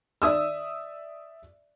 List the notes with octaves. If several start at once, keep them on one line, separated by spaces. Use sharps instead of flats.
D5 E5 D#6 E6